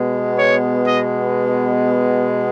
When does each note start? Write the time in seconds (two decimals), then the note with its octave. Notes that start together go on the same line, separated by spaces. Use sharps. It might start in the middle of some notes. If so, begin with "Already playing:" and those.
Already playing: B2 G#3 B3
0.38 C#5
0.85 D#5